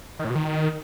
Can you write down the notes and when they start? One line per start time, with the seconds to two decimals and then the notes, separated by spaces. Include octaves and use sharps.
0.19 D#3
0.25 A2
0.30 B2
0.35 D#3